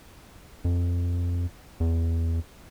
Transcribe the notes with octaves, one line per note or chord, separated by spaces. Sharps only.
F2
E2